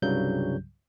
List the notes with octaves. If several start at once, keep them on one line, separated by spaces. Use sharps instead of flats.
C2 G2 C#3 F#3 G3 G6